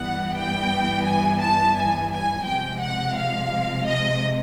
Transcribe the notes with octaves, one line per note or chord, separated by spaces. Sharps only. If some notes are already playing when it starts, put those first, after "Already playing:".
Already playing: G2 E3 G3 B3 F#5
G5
G#5
A5
G#5
G#5
C3 F3 G#3 G5
F#5
F5
D#5